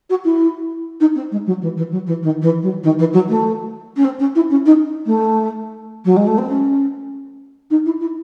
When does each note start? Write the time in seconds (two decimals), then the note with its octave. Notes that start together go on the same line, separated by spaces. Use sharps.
0.10 F#4
0.25 E4
1.00 D#4
1.15 C4
1.31 G#3
1.46 F#3
1.61 E3
1.77 E3
1.91 F#3
2.07 E3
2.23 D#3
2.42 E3
2.62 F#3
2.83 D#3
2.99 E3
3.13 F#3
3.29 A3
3.97 C#4
4.05 C4
4.19 C#4
4.35 E4
4.50 C#4
4.66 D#4
5.06 A3
6.05 F#3
6.16 G#3
6.27 A3
6.38 C4
6.49 C#4
7.70 D#4
7.85 E4
8.00 E4